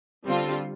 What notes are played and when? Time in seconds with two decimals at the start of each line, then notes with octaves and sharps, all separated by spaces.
0.25 D3 G3 C4 F4 A4